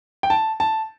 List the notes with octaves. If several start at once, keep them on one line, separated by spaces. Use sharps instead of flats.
G5
A5
A5